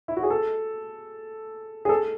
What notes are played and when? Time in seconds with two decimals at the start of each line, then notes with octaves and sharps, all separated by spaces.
0.08 E4
0.17 F#4
0.23 G#4
0.30 A4
1.85 G#4
1.89 A4